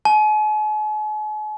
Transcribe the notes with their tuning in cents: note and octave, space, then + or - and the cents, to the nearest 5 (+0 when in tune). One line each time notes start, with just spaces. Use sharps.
G#5 +45